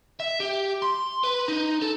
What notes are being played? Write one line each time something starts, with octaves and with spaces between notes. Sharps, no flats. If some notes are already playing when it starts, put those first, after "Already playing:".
E5
G4
C6
B4
D#4
A4